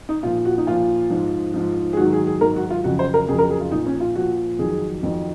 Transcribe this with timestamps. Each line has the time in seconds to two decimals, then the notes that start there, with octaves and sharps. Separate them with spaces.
0.09 D#4
0.23 A#2 F3 F4
0.45 F#4
0.58 D#4
0.67 A#2 F3 F4
1.10 G#2 F3
1.54 G#2 F3
1.93 G#4
1.97 G#2 D#3 F#3 F#4
2.13 G#4
2.27 G#4
2.41 G#2 D#3 F#3 A#4
2.56 F#4
2.70 F4
2.84 F2 C#3 F#3 F#4
2.99 C5
3.14 A#4
3.28 F2 C#3 F#3 G#4
3.39 A#4
3.50 G#4
3.61 F4
3.71 A#2 D#4
3.76 F3
3.86 C#4
4.00 F4
4.15 A#2 F3 F#4
4.59 F2 D#3 F#3 G#4
5.03 F2 D#3 F#3